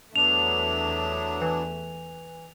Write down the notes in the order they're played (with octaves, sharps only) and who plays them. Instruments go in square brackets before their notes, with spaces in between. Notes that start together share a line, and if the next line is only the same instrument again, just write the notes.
[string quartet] E2 A3 E5 [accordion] F#3 B3 D4 [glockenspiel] F7
[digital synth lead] E3